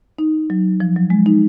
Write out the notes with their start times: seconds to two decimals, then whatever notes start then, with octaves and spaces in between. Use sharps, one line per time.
0.19 D#4
0.50 F#3
0.80 F3
0.96 F#3
1.10 G#3
1.26 D#4